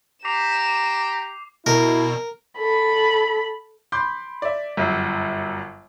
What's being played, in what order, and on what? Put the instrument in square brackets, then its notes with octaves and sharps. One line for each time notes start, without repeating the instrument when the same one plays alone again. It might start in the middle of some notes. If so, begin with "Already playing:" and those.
[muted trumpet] G4 [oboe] A#5 [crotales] D6 C7 F7 [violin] E7
[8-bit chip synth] B2 [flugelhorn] E4 [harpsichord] A#4
[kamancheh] A4 B5
[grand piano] B5 C6 D6 G6
D5 E5
G1 F#2